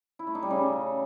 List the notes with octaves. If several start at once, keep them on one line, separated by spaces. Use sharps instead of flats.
E4
A3
D#4
G3
C#3